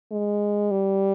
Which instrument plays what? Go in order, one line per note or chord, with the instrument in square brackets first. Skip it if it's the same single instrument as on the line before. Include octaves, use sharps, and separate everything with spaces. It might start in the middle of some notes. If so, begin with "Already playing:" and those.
[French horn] G#3
G3